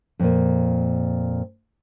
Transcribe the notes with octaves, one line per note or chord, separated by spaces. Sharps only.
F2 A#2